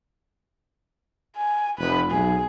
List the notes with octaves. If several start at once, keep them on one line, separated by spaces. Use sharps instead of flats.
G#5
F1 B4
B1 G#4